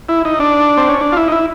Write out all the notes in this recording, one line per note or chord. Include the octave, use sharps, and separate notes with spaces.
E4
D#4
D4
C4
C#4
D4
F4
E4
D#4
E4